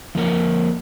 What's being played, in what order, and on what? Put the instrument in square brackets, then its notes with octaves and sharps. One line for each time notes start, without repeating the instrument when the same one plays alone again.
[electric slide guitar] F3 A#3 A#4 C#5